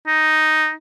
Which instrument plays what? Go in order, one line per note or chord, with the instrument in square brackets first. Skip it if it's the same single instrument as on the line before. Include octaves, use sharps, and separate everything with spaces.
[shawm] D#4